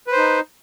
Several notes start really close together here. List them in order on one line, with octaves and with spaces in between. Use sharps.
B4 C5 D#4